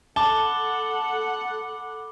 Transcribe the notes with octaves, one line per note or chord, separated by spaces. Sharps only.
A4 F#5 A5 B5 D6 G7